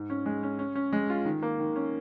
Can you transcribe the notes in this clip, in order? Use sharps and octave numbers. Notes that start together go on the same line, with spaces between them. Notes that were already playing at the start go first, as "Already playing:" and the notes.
Already playing: G#2
C#4
G#3
C#4
C#4
C#4
G#3
F4
D#3
A#3
D#3
C#4